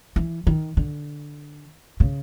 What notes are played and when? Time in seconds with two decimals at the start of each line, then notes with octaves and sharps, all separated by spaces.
0.16 E3
0.47 D#3
0.77 D3
2.00 C#3